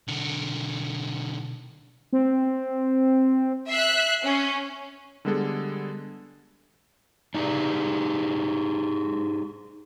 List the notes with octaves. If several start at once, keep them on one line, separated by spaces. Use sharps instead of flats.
B1 D3
C4
E5 F#6 C7
C#4
D3 G3 G#3 B3 G#4 A4
D4 D#4 G4 G#4 D5